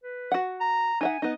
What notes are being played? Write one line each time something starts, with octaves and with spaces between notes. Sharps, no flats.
B4
F#4 F#5
A#5
D#4 E5 F#5 G#5
B3 D#4 D#5